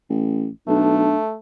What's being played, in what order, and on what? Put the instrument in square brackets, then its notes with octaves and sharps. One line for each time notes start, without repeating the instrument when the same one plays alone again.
[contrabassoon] A1
[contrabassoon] B1 [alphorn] A3 [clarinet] D4